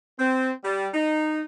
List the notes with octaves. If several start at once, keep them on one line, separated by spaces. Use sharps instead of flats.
C4
G3
D#4